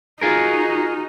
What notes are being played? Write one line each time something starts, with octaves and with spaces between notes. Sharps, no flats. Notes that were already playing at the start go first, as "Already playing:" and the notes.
D#4 F4 F#4 G#4 A#4